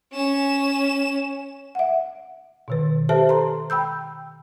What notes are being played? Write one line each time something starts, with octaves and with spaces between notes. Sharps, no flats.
C#4 E7
E5 F#5
B2 D#3 B4
G4 A4 B4 C5 E5 A5
A#5 C6
G5 B5 E6 G6